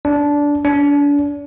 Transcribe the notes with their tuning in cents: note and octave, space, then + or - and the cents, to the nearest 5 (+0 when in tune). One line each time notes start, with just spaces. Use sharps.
D4 -15
D4 -35